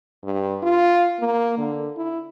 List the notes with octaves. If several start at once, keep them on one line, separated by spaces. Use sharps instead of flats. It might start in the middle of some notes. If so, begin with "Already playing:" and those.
G2
F4
A#3
D3
E4